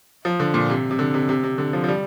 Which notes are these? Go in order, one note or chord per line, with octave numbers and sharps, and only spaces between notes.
F3
D3
A#2
C3
C3
D3
C3
C3
C3
D3
F3
F3
G3